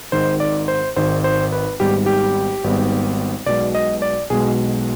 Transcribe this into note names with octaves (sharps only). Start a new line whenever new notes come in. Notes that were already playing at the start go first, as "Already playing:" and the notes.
G#1 G#2 D#3 C5
D5
C5
G#1 G#2 D#3 C5
C5
B4
G#1 G#2 G3 B3 G4
G4
G#1 G#2 G3 B3
B1 B2 G#3 D5
D#5
D5
B1 B2 G#3 G#4